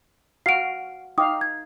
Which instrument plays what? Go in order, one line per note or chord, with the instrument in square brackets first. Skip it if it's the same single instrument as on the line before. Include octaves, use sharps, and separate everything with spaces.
[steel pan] F#4 F5 [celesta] C7 D7
[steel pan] D#4 F5 [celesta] G5 D6 D#6
[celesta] G#6